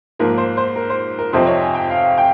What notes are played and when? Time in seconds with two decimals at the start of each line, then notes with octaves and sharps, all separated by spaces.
0.19 G#2 F3 A#3 A#4
0.38 C5
0.57 C5
0.76 A#4
0.90 C5
1.19 A#4
1.33 F2 C3 F3 C4 D#4 C5
1.47 C#5
1.61 G#5
1.75 G5
1.90 F5
2.18 G5